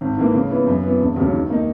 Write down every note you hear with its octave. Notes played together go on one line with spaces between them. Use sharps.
G#1
G#2 E3 A#3
C#3
E3 B3
F#2
E3 B3
E1
D#2 C#3 F#3
D#3
A#3 D#4